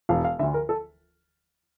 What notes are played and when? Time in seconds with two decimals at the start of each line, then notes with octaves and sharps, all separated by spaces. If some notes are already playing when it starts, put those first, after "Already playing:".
0.09 E1 F5
0.24 F5
0.39 D3 E5
0.43 D2
0.54 A#4
0.69 A4